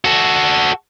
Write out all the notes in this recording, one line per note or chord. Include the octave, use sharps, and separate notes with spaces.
F#4 A4